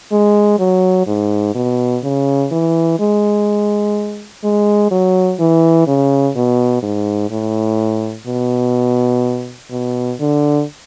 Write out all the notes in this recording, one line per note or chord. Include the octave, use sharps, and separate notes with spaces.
G#3
F#3
G#2
B2
C#3
E3
G#3
G#3
F#3
E3
C#3
B2
G#2
A2
B2
B2
D3